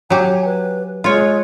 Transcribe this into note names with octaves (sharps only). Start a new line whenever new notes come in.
F#3 G4 G#5
B4
G#3 F4 C#5